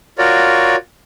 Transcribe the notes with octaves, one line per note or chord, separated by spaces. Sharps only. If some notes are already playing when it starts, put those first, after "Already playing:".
F4 F#4 A#4 C#5 D5